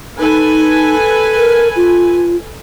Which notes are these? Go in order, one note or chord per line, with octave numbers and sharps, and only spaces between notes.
D#4 A4 B4 G#5
A#4
F4